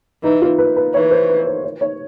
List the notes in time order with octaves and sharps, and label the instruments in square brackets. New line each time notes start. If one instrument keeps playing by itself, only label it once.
[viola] E3 [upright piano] D#4
[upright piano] F4
B4
B4
[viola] E3 [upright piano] C#5
[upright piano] C5
B4
C5
C#5
C#5